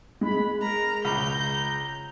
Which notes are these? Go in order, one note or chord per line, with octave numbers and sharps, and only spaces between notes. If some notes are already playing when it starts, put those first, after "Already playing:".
G#3 B5
A#4 A#5
C#2 A#5 B5 G6